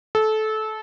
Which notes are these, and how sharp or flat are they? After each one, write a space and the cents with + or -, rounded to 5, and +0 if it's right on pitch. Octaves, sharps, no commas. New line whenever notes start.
A4 -20